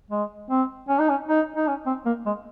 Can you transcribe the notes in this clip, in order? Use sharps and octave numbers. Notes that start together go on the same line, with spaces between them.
G#3
C4
C#4
D#4
C#4
D#4
D#4
C#4
C4
A#3
G#3